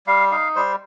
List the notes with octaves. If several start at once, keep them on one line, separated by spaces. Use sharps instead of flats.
G3 F5
D#4 F5
G3 C5